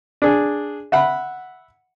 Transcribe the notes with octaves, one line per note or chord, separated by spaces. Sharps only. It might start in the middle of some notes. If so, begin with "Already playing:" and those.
D4 G#4
E5 F#5 B5